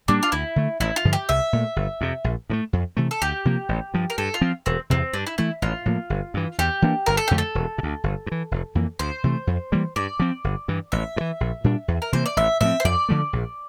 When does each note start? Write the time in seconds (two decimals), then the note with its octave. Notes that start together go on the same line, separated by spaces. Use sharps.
0.08 A2 G3 A#3 D4
0.23 F4
0.32 D2 E4
0.56 D3 A3
0.80 A1 E4
0.96 F4
1.05 G2 D3 F3
1.13 G4
1.29 C2 E5
1.53 A#2 A3
1.76 G1
2.01 F2 C3
2.24 A#1
2.50 A2 F3 A3
2.73 F2
2.97 C3 E3 A3
3.11 A4
3.22 D2 G4
3.45 C3 F3 A#3
3.69 A1
3.94 G2 F3
4.10 A#4
4.18 G2 A4
4.34 F4
4.41 F3 C4
4.66 E1 C4
4.90 E2 C3 C4
5.13 G2 D4
5.27 E4
5.38 E3 A3 E4
5.62 A1 F4
5.86 A2 F3 A#3
6.10 G1
6.34 G2 E3
6.58 E2 G4
6.82 E3 A#3 D4
7.06 G1 A#4
7.17 A4
7.28 F2 D3 A3 G4
7.38 A4
7.55 E1
7.78 C3
7.83 D2
8.04 G1
8.26 G2
8.32 E3
8.51 F1
8.75 F2 E3 A#3
8.99 D2 C5
9.24 C3 E3 A3
9.47 F2
9.72 E3 G3 A#3
9.96 G2 D5
10.20 F3 C4
10.44 G1
10.68 G2 E3
10.92 A1 E5
11.16 G2
11.20 E3
11.40 A#1
11.64 A#2 G3 D4
11.88 E2
12.02 A#4
12.12 C3 E3 A#3 C5
12.26 D5
12.37 A1 E5
12.60 A2 F3 C4 E5
12.80 C5
12.84 F2 D5
13.09 D3 F3 A3
13.33 A#1